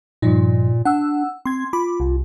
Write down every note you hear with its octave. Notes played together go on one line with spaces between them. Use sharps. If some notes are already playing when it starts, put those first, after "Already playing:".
G2 A#2 F3 D#4
D4 F#5 E6
C4 C6 G#6
F4 B5 D6
C2